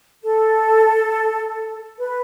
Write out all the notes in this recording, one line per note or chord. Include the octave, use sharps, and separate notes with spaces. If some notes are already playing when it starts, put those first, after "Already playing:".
A4
B4